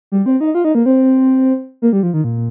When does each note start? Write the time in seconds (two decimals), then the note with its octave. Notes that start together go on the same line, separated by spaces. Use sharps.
0.12 G3
0.26 C4
0.41 D#4
0.55 F4
0.65 D#4
0.75 A#3
0.86 C4
1.82 A#3
1.93 G3
2.03 F3
2.14 D#3
2.24 A#2